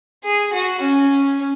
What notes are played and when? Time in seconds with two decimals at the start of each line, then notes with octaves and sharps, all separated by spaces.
0.24 G#4
0.53 F#4
0.81 C#4